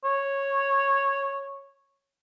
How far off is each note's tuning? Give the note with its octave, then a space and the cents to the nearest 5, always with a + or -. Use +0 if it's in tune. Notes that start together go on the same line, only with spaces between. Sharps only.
C#5 -10